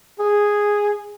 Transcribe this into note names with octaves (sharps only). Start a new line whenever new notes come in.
G#4